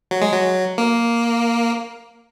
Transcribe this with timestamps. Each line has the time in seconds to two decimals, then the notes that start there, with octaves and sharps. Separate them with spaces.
0.11 F#3
0.22 G#3
0.32 F#3
0.78 A#3